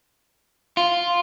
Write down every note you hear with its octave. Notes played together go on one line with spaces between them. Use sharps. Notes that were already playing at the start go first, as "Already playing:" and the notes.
F4